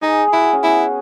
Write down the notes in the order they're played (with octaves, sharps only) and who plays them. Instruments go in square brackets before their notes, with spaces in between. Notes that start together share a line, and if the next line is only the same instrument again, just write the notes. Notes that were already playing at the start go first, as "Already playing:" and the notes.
[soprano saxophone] D#4 [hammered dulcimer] G#4
[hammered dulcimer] G#4
[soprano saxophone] E4 [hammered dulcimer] F#4
[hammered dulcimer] C#4
[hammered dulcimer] B3 [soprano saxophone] E4